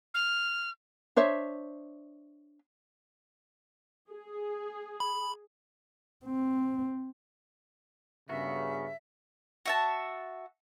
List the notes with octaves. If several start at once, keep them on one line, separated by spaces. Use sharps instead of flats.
F6
D4 C5 C#5 E5
G#4
B5
C4
G2 C#3 B3 F#4 A#4 E5
F#4 E5 A5